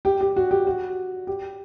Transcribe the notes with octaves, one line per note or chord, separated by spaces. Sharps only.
G4
G4
F#4
G4
F#4
G4